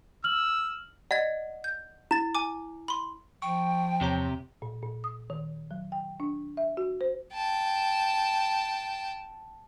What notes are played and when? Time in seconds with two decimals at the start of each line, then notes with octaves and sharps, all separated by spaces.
0.24 E6 F6 F#7
1.11 D5 D#5 F#5 G#6
1.64 G6
2.11 E4 A6 E7
2.35 G#5 D6
2.88 B5 C6
3.42 F3 G5 C#6
4.01 E2 C3 G4 C#5 A#5
4.62 A#2
4.82 A#2
5.04 D#6
5.30 D#3
5.71 F#3
5.92 G5
6.20 D4
6.57 E5
6.77 F#4
7.01 C5
7.34 G5 A5